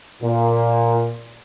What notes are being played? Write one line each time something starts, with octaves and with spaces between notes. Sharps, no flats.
A#2